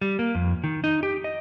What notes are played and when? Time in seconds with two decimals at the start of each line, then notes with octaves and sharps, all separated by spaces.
0.01 G3
0.19 A#3
0.35 F2
0.64 D#3
0.84 D#4
1.03 G4
1.24 D#5